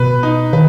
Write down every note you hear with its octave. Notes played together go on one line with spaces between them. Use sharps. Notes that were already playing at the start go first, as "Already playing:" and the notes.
Already playing: B2 B4
D#4
D#3 B4